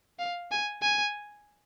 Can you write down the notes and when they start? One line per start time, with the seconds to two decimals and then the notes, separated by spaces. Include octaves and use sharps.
0.19 F5
0.51 G#5
0.82 G#5